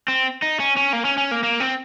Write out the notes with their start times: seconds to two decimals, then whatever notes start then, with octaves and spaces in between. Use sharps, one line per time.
0.08 C4
0.42 D#4
0.60 C#4
0.77 C#4
0.93 A#3
1.05 C#4
1.18 C#4
1.31 A#3
1.43 A#3
1.60 C4